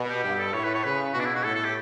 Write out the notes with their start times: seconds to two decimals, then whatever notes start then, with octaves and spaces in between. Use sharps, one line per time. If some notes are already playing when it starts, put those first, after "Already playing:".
Already playing: B2
0.09 G4
0.23 G2 G4
0.35 G4
0.38 A4
0.54 A2 C#5
0.65 B4
0.74 C#5
0.84 C#3 B4
1.14 B2 F#4
1.20 D4
1.25 E4
1.35 F#4
1.44 A2 A4
1.55 A4
1.65 G4